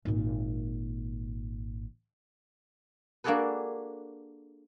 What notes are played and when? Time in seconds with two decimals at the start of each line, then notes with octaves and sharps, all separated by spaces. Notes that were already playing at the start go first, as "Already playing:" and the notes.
0.05 G#1 A#2
3.24 A#3 D4 F#4 G#4 A4 B4